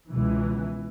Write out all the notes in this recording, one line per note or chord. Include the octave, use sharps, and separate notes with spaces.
C#2 B2 E3